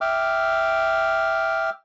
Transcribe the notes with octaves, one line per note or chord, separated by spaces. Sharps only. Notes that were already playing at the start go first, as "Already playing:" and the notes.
E5 G5 D6 F6